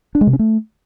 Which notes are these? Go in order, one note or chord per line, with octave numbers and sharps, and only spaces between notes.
D4
G#3
C3
C#4
A3